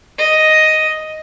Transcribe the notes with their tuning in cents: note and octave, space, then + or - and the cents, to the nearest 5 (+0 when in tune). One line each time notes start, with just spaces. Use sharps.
D#5 +5